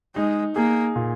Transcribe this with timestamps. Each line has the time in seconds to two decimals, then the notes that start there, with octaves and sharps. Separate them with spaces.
0.16 G#3 D#4
0.56 A#3 G#4
0.96 A#2